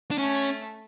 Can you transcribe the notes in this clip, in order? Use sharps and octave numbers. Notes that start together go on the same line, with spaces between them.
D4
A3 C#4